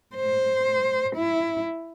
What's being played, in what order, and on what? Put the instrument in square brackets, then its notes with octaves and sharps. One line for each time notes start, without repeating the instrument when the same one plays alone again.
[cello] C5
E4